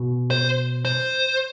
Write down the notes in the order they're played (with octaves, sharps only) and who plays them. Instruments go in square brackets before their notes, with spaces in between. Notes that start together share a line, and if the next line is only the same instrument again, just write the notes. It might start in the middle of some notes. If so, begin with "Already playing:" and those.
Already playing: [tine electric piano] B2
[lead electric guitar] C5
C5